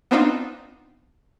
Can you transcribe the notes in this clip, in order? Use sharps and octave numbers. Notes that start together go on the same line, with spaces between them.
B3 C4 D4 D#4 F4